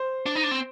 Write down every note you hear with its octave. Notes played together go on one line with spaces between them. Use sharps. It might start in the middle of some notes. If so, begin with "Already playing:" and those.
Already playing: C5
D4
D#4
D4
C4